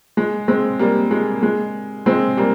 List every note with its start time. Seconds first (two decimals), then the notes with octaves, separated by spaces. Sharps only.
0.17 G#3
0.48 G#3 C4
0.79 G3 A#3
1.11 G#3
1.43 G#3
2.06 G#3 C4
2.37 G3 A#3